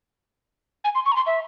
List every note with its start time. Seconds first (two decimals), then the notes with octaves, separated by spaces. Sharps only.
0.84 G#5
0.95 C6
1.06 C#6
1.12 A#5
1.16 C6
1.27 E5